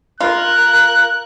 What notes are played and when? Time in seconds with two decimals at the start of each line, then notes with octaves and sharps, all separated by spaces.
0.20 F4 A#4 F#6